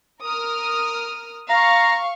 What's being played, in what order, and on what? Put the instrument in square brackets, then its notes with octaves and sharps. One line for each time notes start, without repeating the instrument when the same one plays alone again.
[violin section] A#4 D#6 F6
[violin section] F5 C#6 [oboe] A#5